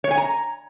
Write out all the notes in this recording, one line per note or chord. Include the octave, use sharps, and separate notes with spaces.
C#5
G#5
A#5